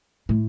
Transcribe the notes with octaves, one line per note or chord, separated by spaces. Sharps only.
A2